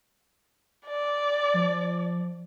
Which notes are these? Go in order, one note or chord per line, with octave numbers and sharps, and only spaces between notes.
D5
F3